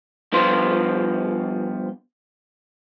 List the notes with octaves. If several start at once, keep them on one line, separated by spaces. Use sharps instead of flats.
G2 F3 B3 F4 C6